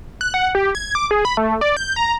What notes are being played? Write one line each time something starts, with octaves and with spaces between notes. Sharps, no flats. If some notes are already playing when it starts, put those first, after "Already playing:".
F#6
F#5
G4
G#6
D6
G#4
B5
A3
D5
G6
A#5